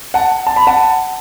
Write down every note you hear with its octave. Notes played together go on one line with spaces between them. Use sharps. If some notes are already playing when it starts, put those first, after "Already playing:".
F#5 A5
A5
B5
F#5 A5